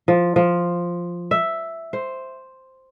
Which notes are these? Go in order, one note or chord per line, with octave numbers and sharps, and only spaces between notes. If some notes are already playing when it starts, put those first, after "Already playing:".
F3
F3
E5
C5